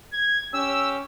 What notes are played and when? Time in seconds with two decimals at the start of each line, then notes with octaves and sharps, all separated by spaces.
0.13 G#6
0.54 C#4 G4 E6